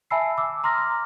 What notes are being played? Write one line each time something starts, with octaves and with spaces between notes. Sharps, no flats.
E5 G#5 A5 B5 E6 C7
D6 E6
A#5 C6 D6 F6 A#6